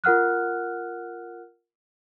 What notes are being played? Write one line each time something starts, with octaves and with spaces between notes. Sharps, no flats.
F4 A#4 F#5 F6 F#6